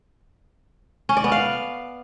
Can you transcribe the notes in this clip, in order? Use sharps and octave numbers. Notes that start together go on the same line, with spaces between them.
C#4
D5
B3
F5